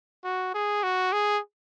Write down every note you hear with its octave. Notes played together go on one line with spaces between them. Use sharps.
F#4
G#4
F#4
G#4